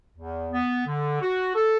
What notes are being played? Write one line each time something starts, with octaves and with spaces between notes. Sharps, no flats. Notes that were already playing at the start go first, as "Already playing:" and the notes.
E2
B3
D3
F#4
A4